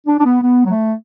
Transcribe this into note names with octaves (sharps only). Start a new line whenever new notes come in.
D4
D4
B3
B3
F#3
A3